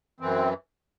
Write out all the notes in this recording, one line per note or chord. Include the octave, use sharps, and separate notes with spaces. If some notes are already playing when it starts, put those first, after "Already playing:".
F#2 E3 C4